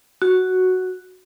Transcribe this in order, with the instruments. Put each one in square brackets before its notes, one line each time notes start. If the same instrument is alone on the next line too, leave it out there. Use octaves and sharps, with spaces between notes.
[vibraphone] F#4